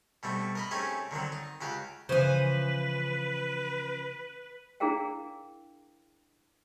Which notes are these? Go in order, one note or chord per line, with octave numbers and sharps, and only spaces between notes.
B2 G3 A3 C4
A#4 D#5 B5
A3 C4 C#4 D#4 G4 G#4
D3 D#3 F#3 C4
D#4
C#2 F#4 G4 F5
C#3 E3 F3 B4 C5 G#5
D4 E4 G#4 A#4 F5 G5